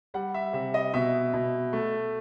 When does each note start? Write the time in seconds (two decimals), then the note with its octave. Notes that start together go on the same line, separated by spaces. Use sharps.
0.14 G3 F#5
0.34 E5
0.53 C3 E5
0.74 D#5
0.94 B2 E5
1.33 B2
1.73 A3